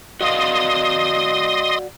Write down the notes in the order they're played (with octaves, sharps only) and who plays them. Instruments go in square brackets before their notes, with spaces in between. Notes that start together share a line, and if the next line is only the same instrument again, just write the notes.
[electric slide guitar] F#4 D5 F5 [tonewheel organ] D#5 C6 D#6